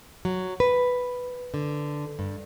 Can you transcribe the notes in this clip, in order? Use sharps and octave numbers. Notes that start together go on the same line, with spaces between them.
F#3
B4
D3
G2